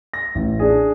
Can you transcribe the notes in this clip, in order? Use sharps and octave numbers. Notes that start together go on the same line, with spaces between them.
A#6
A1
D4 G#4